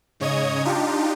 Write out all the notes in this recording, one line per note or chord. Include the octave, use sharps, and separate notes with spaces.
G#2 C#3 C#5 D#5 D#6 G#6
D4 D#4 F4 G4